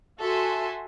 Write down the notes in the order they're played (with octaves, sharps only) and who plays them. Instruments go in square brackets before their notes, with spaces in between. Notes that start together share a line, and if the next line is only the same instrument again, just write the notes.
[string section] F#4 A4 E5 G#5 C6